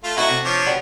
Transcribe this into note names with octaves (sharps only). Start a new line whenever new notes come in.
A3 F4
A3 D#4 E4 F#4 C#5
C3
F3 D4 C#5
F#3 G3 B3